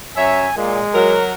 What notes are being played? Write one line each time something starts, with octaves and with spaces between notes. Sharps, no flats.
F#2 C#5 E5 G#5
A#2 G#3
F#3 A#4